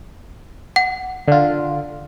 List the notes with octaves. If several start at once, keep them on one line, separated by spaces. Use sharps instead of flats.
F#5
D3 F4